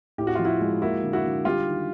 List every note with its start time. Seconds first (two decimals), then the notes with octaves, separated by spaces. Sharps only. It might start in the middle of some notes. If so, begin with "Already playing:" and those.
0.18 A2 G4
0.27 F#4
0.35 F4
0.39 F3
0.45 E4 F#4
0.61 G#3
0.82 A#3 E4 F#4
1.03 D3
1.13 E4 F#4
1.24 D3
1.45 G3 F4 G4
1.67 D#3